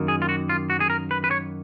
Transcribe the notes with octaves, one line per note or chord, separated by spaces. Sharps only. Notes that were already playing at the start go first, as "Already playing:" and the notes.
Already playing: F#2 D#3 A#3
G#4
F4
F#4
F4
F#4
G#4
A#4
B4
B4
C#5